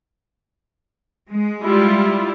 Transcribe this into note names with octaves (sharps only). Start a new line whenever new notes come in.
G#3
G3 E4 F4